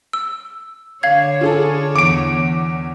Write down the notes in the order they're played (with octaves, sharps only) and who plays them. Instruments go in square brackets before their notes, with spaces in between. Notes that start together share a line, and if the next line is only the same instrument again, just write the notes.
[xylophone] E6
[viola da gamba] D3 C#5 [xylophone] F5 G#6
[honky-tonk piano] F4 G#4 A4
[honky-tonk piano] E2 [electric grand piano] D6 D7